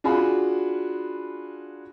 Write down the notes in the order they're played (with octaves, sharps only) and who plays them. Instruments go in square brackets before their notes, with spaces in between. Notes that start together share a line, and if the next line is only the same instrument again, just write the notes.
[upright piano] D4 F4 F#4 G#4 B5